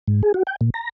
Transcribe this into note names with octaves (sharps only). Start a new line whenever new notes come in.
G#2
G#4
F#4
G5
A#2
A#5